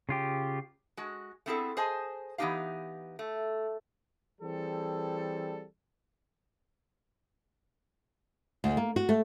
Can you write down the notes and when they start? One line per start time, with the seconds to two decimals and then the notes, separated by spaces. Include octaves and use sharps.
0.09 C#3 F4 G4
0.97 G#3 F#4
1.46 A3 B3 C4 E4 G#4 A4
1.77 G#4 C5 D#5 G#5 A5
2.38 E3 B3 C#4 D#4 G4 F5
3.19 A3
4.41 E3 G3 C4 G#4 A4
8.64 D2
8.77 A#3
8.96 F#4
9.09 A3